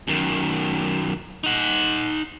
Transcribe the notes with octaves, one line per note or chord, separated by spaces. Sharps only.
F#2 D#3
D#4 F#5